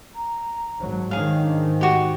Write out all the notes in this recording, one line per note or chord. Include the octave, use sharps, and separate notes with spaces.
A#5
G#1 F#3
G#2 D#3 G#4 C#5 F5
D4
F#4 G4 F#5